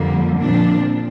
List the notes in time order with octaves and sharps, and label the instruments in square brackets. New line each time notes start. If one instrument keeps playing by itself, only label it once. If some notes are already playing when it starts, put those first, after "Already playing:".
Already playing: [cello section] F2 D3 G3 A#3
A#2 F3 C4 D4